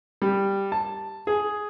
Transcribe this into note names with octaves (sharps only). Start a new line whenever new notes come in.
G3
A5
G#4